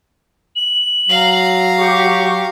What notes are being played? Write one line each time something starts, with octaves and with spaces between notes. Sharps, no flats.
F#7
F#3 F5 A#5
G4 C#6